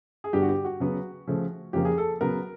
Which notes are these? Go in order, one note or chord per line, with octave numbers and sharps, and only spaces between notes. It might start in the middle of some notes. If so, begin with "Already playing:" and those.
G#4
G2 D3 G3 B3 G4
F#4
G4
F#4
C#3 F#3 B3
C#3 F3 A3
F2 C#3 F3 A#3 G4
G#4
A4
C#3 F#3 B3 A#4